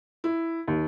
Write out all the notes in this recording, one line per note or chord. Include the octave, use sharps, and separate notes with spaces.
E4
D#2